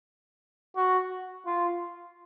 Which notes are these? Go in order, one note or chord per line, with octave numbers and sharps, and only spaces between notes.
F#4
F4